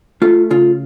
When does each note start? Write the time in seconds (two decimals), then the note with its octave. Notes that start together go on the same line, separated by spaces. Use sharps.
0.22 A3 F4
0.50 C#3 F4